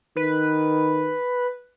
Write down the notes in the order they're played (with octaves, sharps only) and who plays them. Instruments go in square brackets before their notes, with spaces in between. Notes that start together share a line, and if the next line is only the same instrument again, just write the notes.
[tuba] D#3 [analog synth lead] B4